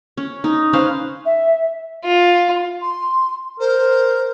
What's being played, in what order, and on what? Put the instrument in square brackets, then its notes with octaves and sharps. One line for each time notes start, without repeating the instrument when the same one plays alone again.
[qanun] C#4
D#4
C#4 B4 C5 F5
[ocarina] E5
[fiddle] F4
[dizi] C6
[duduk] A#4 [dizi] C5